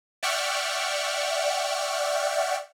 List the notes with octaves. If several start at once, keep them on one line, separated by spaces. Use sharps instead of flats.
D5 E5 F#5 G5 C#6 F6